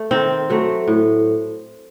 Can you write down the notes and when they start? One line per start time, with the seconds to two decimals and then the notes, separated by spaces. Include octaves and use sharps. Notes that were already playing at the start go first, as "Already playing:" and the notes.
Already playing: A3
0.11 D#3 C4
0.50 F#3 A3
0.88 A2